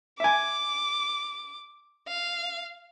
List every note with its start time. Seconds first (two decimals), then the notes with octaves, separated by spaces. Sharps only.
0.20 E5 G#5 D6
2.08 F5